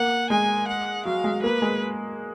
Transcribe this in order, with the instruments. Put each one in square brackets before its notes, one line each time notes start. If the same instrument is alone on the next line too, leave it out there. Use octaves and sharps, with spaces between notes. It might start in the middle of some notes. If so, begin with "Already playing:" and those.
Already playing: [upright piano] A#3 [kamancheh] F#5
[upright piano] G#3 [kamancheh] G#5
[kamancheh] F#5
[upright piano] F#3 [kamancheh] F5
[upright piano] G#3
[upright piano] A#3 [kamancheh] B4
[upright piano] G#3